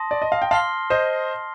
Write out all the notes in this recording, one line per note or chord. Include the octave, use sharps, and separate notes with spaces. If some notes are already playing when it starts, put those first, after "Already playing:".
Already playing: A5 C6 D#6 A#6
D5
D#5
F5
G5
F5 A5 C6 F6 C7 G7
C5 D#5